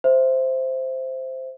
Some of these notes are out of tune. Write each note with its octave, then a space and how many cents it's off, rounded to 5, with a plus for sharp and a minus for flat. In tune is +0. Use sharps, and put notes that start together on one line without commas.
C5 +0 E5 +0